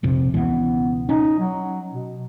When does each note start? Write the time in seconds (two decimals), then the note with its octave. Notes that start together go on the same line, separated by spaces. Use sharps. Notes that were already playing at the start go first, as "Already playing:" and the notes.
0.03 A#1 F2 C3
0.34 C#2 B2 E3 B3
1.09 C#4 D#4
1.39 F#3
1.91 B2